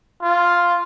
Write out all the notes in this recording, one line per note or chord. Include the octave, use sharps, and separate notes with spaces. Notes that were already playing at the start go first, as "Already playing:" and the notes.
F4